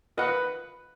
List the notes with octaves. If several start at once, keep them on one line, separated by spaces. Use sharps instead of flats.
F4 A#4 B4 D#5 F#5